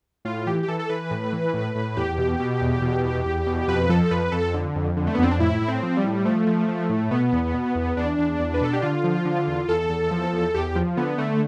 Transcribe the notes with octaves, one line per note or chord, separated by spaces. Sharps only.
A2 F4
E3 G4
G4
E3 A4
A4
E3 B4
A2
E3
A2
A2
E2 G4
B2
B2
E2
B2
E2
E2
B2
F2 B4
F3 A4
F2 B4
F2 A4
D3
F2
D3
A3
B3
F2 C4
D4
A2 E4
A2
C4
F3
G3
A2
F3 A3
F3
F3
A2
B2 B3
E2
B2
E2
E2 D4
E2
E2
B4
B2 A4
G4
D3 F4
F3
D3
E2
E2 A4
E2
F3
E2
E2 G4
F3
D3 B3
D3 A3